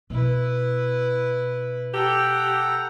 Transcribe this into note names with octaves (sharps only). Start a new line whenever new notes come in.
B2 E4 B4
G4 A4 F#5 G5 A#5